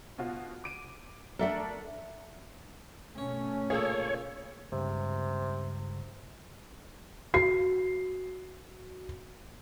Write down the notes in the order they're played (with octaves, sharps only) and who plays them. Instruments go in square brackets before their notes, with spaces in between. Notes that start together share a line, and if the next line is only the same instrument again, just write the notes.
[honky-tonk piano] B2 F4 F#4
D6 D7 D#7
[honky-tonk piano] A3 D4 A#4 [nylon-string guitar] A4 E5 F#5
[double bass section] B2 A3 C#4 [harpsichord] C#5
[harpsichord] A#2 C#3 [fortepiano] G#4 A4 [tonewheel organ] C#5
[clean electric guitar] C#2 G2 [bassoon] C3
[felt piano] F#4 C7